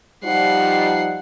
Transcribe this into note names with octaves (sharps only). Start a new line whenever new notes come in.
F3 G3 D#4 F#5 C7